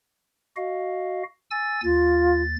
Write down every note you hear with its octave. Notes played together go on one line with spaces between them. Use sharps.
F#4 D#5 F5
G#5 E6 A6
D#2 F4 A6